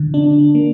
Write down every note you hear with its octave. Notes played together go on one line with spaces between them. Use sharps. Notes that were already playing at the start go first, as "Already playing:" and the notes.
Already playing: D3
D4
A#3